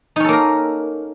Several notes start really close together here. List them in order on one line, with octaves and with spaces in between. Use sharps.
D#4 C#4 A4 A#3 A#4